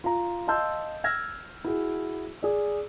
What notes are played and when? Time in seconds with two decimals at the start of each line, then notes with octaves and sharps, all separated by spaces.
0.04 F4 A#5
0.47 D#5 F5 A5 C6 E6 G6
1.04 E6 F6 G#6 A#6
1.65 E4 F#4 G#4
2.43 G#4 D5